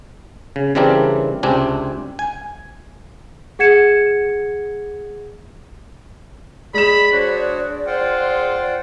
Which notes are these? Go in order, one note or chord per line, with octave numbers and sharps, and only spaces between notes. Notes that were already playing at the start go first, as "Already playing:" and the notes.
C#3
C#3 E3 G3 C4 D4 A#4
C#2 C3 C4 D4 G#5
G#5
G#4 F#5 G#6 C#7 E7
G#3 D5 B5 E7
D4 F#4 C5 C#5
F4 C5 F#5 G5